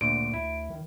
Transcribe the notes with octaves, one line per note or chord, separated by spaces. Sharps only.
D2 A#2 D7
D2 E4
D#3